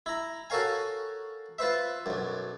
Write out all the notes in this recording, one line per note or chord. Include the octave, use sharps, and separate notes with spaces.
E4 A#5
F#4 A4 A#4 C#5 F5 G#5
F4 B4 C5 E5
B1 F#2